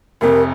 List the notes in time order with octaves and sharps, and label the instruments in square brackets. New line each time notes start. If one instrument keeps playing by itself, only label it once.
[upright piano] F1 F2 C3 [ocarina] A#4